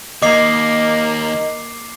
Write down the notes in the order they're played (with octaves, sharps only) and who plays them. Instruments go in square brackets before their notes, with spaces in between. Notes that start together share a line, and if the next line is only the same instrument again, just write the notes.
[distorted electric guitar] D#2 [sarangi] A#3 [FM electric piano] D#5 [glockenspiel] D6 C7